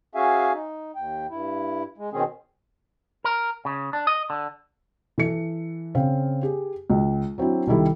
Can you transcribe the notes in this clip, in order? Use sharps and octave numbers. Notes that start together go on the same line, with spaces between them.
C#4 F#4 G#4 E5 F5 G#5
D#4
D#2 G5
G2 E4
G#3
B2 D#3 C4 C#4 G#4
A#4
C#3
D4
D#5
D3
E3 A4 C#7
C#3 C4 F5
G4 G#4
C#2
F#3 C4 D4 E4
C2 D#3 G3 E4 A4